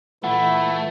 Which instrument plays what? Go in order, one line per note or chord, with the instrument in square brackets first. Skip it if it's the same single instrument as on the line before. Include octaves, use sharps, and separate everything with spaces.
[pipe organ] A#2 E3 [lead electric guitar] A3 [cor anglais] E4 [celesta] F#5